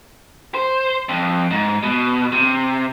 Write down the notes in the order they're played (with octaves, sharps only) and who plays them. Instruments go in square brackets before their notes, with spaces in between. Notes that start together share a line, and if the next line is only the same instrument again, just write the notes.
[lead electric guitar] C5
F2
G#2
B2
C3